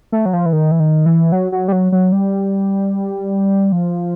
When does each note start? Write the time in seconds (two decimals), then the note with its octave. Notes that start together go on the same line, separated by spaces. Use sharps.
0.12 A3
0.26 F#3
0.33 F3
0.46 E3
0.53 D#3
0.71 E3
0.80 D#3
1.06 E3
1.32 F#3
1.52 F#3
1.68 G3
1.72 F#3
1.92 F#3
2.12 G3
3.72 F3